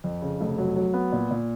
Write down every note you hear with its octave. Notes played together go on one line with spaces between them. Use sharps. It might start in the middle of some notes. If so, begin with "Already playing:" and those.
F2
C#3
F1
F#3
F#3
B3
A#2
A#2